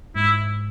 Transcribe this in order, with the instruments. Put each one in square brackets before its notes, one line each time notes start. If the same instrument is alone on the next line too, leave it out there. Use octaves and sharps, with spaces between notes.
[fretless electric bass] G#2 [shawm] E4